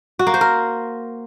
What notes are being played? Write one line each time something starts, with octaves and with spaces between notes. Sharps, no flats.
F#4
A#3
C5
A#4